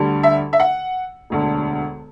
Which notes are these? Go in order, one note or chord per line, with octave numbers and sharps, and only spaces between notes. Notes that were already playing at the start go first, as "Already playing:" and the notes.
Already playing: D2 D3 G3
E5
E5
F#5
E1 D2 D3